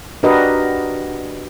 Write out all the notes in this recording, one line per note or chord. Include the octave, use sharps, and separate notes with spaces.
D4 F#4 G4 A#4 B4 D#5